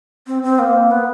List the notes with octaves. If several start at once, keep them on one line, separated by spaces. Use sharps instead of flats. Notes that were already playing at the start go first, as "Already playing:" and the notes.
C4
C4
A#3
B3